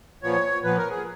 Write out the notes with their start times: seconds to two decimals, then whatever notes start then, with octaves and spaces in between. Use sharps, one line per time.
0.23 A#2 F3 B3 C#5
0.63 A#2 F3 B3 B4
0.77 A#4
0.90 G#4